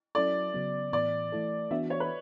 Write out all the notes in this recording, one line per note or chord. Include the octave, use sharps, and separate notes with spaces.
F#3 C#4 E4 A4 D5
C#3 F#3 B3
A2 E3 B3 D5
E3 A3 E4 A4
E3 B3 D4 F#4 E5
C#5
B4